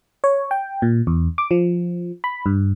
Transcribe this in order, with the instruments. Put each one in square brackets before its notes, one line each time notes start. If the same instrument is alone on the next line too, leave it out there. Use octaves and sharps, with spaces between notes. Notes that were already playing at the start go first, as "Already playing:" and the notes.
[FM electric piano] C#5
G5
A#2
E2
D6
F3
B5
G2